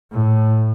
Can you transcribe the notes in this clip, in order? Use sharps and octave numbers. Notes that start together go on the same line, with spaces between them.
A2